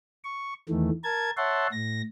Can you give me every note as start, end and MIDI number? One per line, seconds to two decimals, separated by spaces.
0.24 0.54 85
0.69 0.90 40
0.69 0.90 51
0.69 0.90 52
0.69 0.90 57
1.04 1.31 70
1.04 1.31 81
1.04 1.31 92
1.37 1.67 73
1.37 1.67 76
1.37 1.67 78
1.37 1.67 81
1.37 1.67 84
1.72 2.02 45
1.72 2.02 94